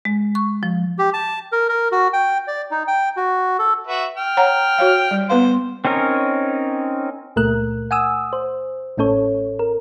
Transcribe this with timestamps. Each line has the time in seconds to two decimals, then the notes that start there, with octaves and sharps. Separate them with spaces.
0.05 G#3
0.35 C#6
0.63 F3
0.98 G4
1.13 A5
1.52 A#4
1.69 A#4
1.92 F#4
2.13 G5
2.47 D5
2.71 D#4
2.88 G5
3.17 F#4
3.59 A4
3.87 F#4 B4 E5
4.17 G5 F6
4.37 C#5 F#5 A#5
4.78 F#4 C#5 F5
5.11 G3
5.30 B3 B4 C5 F5
5.85 C4 C#4 D#4 A#4 C#5
7.36 C#2 A#2 A3 A#4 F#6
7.91 F#5 G#5 D#6 E6
8.33 C5
8.97 A1 A2 C#4 A4 C#5
9.59 A#4